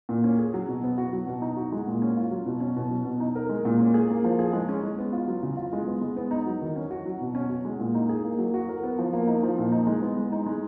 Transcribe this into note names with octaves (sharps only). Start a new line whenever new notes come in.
A#2
C#4
G#4
F#3
B2
B3
F#4
F#3
B2
D#4
F#4
G#3
A#2
C#4
F4
F#3
B2
C#4
B2
F#3
B2
D#4
A#4
G#3
A#2
C#4
G#4
A#3
F3
G#4
G#3
C#4
G#3
B3
F4
F#3
C#3
F4
G#3
B3
G#3
B3
D#4
F#3
D#3
C#4
F#4
F#3
B2
C#4
F#4
G#3
A#2
D#4
G#4
A#3
F#3
F#4
A#4
B3
F3
A#3
D#4
F3
A#2
D#4
G#3
B3
G#3
D#4
G#3